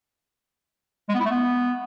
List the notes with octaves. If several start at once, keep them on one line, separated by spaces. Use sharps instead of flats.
G#3
B3
E4
A3
B3